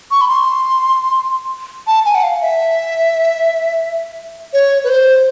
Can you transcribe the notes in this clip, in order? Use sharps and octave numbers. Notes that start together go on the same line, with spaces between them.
C#6
B5
C6
A5
G#5
F#5
F5
E5
C#5
B4
C5